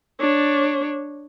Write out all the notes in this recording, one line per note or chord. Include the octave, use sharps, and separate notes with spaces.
D4 C#5